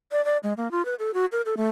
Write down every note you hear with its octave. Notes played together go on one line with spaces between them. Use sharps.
D5
D5
G#3
A#3
F4
B4
A4
F#4
A#4
A4
A3